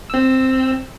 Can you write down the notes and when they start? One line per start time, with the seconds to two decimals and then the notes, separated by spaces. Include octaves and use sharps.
0.10 C4 E6